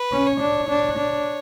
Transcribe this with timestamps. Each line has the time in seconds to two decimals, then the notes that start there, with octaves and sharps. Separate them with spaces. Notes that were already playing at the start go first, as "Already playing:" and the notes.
Already playing: B4
0.12 C#4
0.27 C#5
0.41 D4
0.69 D4
0.99 D4